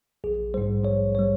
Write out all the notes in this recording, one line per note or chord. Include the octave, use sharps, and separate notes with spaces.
A#1 G#4
G#2 G3 C5
A#1 C#5
G3 C#5